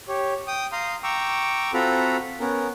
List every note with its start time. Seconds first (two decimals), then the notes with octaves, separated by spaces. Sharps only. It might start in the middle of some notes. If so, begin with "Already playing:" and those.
0.08 G4 C#5
0.47 G5 D#6
0.72 F5 A#5 C6 D#6
1.03 G5 A#5 C#6 D6 E6
1.74 C4 F4 F#4 A4 A#5 B5
2.40 B3 C#4 A#4